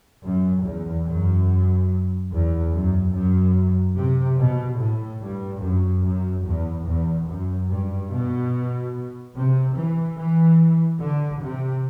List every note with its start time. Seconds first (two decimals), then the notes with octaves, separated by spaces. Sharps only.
0.24 F#2
0.65 E2
1.07 F#2
2.31 E2
2.72 F#2
3.13 F#2
3.97 C3
4.38 B2
4.79 A2
5.21 G2
5.62 F#2
6.04 F#2
6.45 E2
6.86 E2
7.27 F#2
7.70 G2
8.11 B2
9.35 C3
9.76 E3
10.17 E3
11.01 D3
11.42 C3